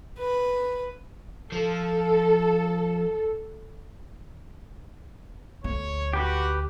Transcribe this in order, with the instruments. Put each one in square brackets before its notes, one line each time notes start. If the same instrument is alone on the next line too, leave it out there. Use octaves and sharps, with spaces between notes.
[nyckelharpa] B4
[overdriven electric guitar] F3 [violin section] A4
[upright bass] D2 [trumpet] C#5
[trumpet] F#4 [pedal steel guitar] G4 B4